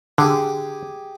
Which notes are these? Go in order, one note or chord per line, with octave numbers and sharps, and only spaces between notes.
D3 G4 G#4